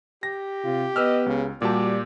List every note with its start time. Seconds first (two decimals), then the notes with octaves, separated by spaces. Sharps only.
0.23 G4 A#6
0.64 C3 F4
0.96 B3 B4 D#5 E6 F6
1.26 C#2 C#3
1.62 A#2 G3 F#4 G4 D5 A5